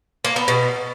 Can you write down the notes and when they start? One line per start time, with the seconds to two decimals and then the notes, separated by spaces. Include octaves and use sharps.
0.25 A#3
0.36 B3
0.48 B2